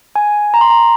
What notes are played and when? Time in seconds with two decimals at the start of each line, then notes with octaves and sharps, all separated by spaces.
0.16 G#5
0.54 A#5
0.61 C6
0.70 A#5